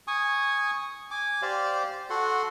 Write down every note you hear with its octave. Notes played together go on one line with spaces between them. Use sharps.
G#5 C#6 D#6
G#5 D6
G4 C5 D5 F5
F#4 A4 F#5 C6